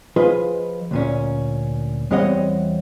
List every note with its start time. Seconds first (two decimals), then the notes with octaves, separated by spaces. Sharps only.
0.16 F3 F4 G#4 B4 D#5
0.91 D2 A#2 C#4
2.11 E2 G3 C4 C#5 D#5 F#5